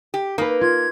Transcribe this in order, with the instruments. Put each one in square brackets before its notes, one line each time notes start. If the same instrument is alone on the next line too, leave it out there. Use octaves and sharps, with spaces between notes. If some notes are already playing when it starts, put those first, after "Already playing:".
[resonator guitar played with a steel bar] G4
[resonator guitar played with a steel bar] A#3 [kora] D#4 B4
[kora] F4 [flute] G#6